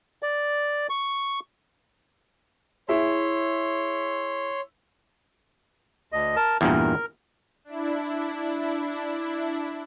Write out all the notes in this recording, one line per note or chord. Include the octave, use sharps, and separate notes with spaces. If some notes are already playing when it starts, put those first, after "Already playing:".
D5
C#6
E4 G#4 C#5 E5 C6
D2 D#5
A#4 A5
E2 G2 A#2 A#4
D4 E4